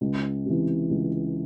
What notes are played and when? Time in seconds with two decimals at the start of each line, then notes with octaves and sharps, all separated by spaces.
0.01 C#2
0.46 C3 E3
0.91 C#2